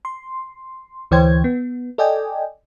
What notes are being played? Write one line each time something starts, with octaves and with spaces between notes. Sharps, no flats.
C6
D2 E3 C5 C#5 G5 G#6
B3
A4 D5 D#5 G5 G#5